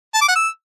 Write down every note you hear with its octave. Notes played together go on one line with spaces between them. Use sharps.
A5
D6
F#5
E6